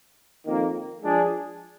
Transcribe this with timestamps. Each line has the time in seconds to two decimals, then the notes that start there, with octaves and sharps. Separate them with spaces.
0.44 F2 D#3 A#3
1.01 F3 G#3 D4 G#4